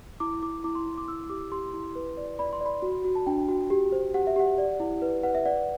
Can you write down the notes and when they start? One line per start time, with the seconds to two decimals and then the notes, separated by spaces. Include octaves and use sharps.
0.20 E4 D6
0.43 E4 D6
0.64 E4 D6
0.75 C6
0.86 E4
0.97 D6
1.08 E4 E6
1.29 G4 D6
1.52 G4 C6
1.73 E4
1.95 B4
2.17 D5
2.39 D5 B5
2.53 C6
2.61 D5 B5
2.82 F#4
3.05 F#4
3.15 A5
3.26 D4 G5
3.49 F#4
3.70 G4
3.92 C5
4.14 G4 F#5
4.27 E5
4.36 G4 F#5
4.58 D5
4.80 E4
5.02 B4
5.23 B4 F#5
5.35 E5
5.45 D5 F#5